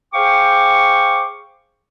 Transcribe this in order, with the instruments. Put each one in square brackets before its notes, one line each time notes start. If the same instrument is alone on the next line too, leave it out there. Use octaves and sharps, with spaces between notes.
[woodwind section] G#4 C5 F5 G5 C#6 D6